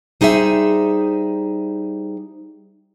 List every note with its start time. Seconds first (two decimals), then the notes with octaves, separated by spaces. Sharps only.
0.21 G3 D#4 G#4 C5 E5